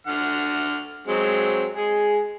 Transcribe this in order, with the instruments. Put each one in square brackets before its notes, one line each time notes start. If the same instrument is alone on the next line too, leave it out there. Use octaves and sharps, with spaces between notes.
[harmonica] D3 F#5 F6
F#3 G#3 C4
G#3 G#4